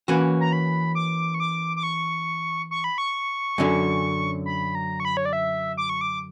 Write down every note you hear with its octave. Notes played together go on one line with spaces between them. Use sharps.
E3 A#3 C#4 F#4 B4
A#5
B5
D6
C#6
D6
D6
C#6
C#6
B5
C#6
F#2 D3 F#3 C#4
B5
A#5
C#6
B5
C#5
D5
E5
D6
C#6
D6